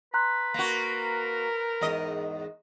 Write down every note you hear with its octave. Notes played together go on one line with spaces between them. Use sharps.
B4 A#5 C6 F#6
A#3 F#4 A#4
E2 G#2 D#5